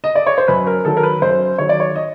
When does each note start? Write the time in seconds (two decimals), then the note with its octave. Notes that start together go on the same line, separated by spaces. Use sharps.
0.04 D#5
0.15 D5
0.27 C#5
0.38 C5
0.48 F#2 B4
0.67 A#4
0.85 D#3 F#3 A4
0.97 A#4
1.03 B4
1.22 F#2 C5
1.58 D#3 F#3 C#5
1.69 D5
1.80 C#5
1.96 D#5